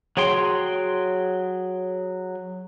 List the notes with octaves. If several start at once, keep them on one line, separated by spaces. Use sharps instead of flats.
F#3 G#4 C#5 G5 C6